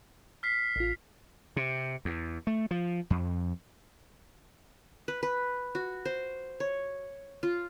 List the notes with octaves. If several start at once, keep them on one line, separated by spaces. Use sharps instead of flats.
F6 B6 C7
A1 F4 B6
C3
E2
A3
F3
F2
B4
B4
F#4
C5
C#5
F4